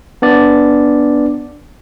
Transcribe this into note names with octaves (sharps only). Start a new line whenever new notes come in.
B3 D4 D5